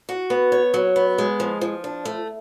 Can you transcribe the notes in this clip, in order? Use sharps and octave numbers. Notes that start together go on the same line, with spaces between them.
F#4
B3
C#5
F#3
B3
G#3
F3
F3
D4
A3